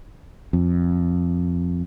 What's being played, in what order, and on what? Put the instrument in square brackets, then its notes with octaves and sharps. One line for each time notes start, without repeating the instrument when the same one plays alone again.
[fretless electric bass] F2